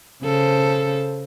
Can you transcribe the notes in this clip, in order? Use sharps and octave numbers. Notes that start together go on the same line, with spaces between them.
C#3 A4 C5